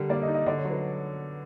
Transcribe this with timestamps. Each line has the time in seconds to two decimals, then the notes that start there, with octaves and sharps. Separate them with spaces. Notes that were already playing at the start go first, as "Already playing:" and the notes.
Already playing: D3 G3 A#4
0.09 A#3 D5
0.22 D#5
0.28 D#4
0.34 D#5
0.46 D3 D5
0.58 C#5
0.65 F#3
0.70 B4